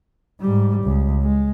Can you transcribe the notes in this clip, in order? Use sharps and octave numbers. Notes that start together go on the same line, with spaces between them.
G#2 G3
C#2
G#3